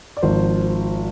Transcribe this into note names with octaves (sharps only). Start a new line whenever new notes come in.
D5
G#1 G#2 F3 C5